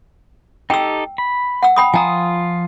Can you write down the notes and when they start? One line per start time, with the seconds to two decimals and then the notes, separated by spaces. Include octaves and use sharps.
0.70 D#4 G4 A4 G5 E6
1.18 B5
1.63 F#5 E6
1.76 G5 B5 D#6
1.94 F3 F4 G#5 A#5 D#6